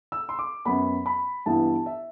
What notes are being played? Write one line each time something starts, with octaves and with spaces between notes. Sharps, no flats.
E6
C6
D6
F#2 F#3 B3 B5
B5
G2 E3 B3 E4 A5
E5